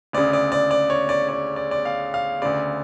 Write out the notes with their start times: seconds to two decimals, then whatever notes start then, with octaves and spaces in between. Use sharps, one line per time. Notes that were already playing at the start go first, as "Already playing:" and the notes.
0.13 D2 C#3 D5
0.33 D5
0.52 D5
0.71 D5
0.90 C#5
1.09 D5
1.29 D5
1.56 D5
1.71 D5
1.85 F5
2.14 F5
2.42 D2 C#3 D5